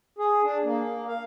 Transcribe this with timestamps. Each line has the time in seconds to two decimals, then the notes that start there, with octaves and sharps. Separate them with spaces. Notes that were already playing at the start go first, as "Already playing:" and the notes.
0.19 G#4
0.44 D4
0.64 A#3
1.08 F5